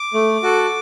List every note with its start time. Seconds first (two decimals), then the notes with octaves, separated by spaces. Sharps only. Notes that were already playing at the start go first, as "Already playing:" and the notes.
Already playing: D6
0.14 A3
0.43 F#4 A4